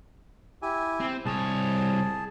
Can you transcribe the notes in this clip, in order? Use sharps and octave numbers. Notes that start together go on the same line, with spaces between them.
E4 G4 G#5
C4
C2 G#4 C#5 A5